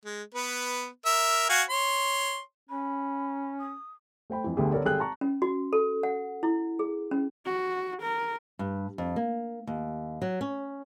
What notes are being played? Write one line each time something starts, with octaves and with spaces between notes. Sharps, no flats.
G#3
B3 B4
A#4 E5
F#4 F5 G#5
C#5 C6
C#4 B5
D#6
A3 C5 G5 B5
F2 E3
D2 D3 A3 B3 G4 G#4
D3 B3 A4 A#4 C#5 D5
G#1 G3 G#4 A4 G5 F#6
A5 A#5 C#6
C#4
F#4
A4
F#5
E4
G#4
C#4
F#4
A#4
G2
F2
A#3
D#2
F#3
C#4